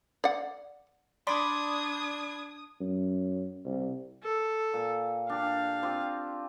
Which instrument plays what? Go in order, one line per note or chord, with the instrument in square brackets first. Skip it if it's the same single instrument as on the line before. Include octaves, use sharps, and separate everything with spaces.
[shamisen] D5 F#5
[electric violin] D4 G#6 [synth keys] D5 B5 [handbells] C6 D6 [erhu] D#6
[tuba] F#2
C2
[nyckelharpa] A4
[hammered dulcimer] A#2
[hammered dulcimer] D4 G4 [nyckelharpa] F5
[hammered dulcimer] C4 F4 G4